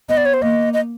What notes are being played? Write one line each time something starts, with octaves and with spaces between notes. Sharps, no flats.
B3 D#5
D5
C#5
C5
A#3 D#5
D#5